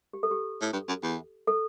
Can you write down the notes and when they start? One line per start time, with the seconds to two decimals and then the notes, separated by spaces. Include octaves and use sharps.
0.13 G4
0.23 A4
0.31 G4
0.61 A2
0.73 G2
0.88 F#2
1.03 E2
1.47 A4